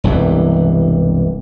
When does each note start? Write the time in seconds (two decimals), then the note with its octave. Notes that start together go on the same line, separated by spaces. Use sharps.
0.04 E1 C2 G2 E3